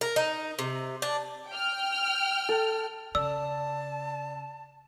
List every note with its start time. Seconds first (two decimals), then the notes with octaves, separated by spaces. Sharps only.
0.01 A#4
0.16 D#4
0.59 C3
1.02 D4
1.49 G5 F6
2.49 A4
3.15 C#3 D5 A5 E6